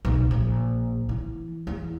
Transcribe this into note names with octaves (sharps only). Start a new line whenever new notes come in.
B1
A#1
E3
E2